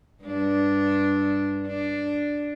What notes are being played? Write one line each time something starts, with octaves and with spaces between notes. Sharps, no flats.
G2 D4
D4